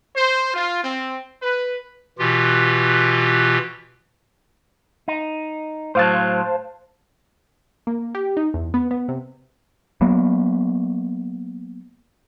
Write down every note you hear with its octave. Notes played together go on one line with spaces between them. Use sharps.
C5
F4
C4
B4
B2 E3 F4 G4
D#4
A2 F#3 C5 F5 A5
A#3
G4
D#4
E2
B3
B3
C3
F#3 A#3 B3